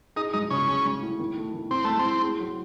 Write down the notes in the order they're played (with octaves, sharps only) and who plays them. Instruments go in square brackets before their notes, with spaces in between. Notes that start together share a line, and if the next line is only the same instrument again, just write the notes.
[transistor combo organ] D#4 [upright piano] G#4
[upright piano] G#3 [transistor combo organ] D#4
[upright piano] C#3 [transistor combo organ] C#4
[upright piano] G#4
G#3
A2
D#3
A3
D#3
[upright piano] A2 [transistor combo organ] C4
[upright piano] G#3 [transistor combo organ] A3
[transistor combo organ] C4
[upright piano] A2
G#4
F#3